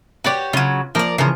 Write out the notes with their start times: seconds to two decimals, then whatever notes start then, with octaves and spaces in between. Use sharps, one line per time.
0.24 F#4 G4 B4 C#5 D5
0.53 C#3 F#3 F4
0.95 F3 A#3 A#4 D5
1.18 C#3 E3 F3 F4 A#4